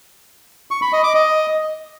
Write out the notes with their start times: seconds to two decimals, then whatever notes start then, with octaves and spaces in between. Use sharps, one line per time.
0.71 C#6
0.82 B5
0.93 D#5
1.04 D6
1.15 D#5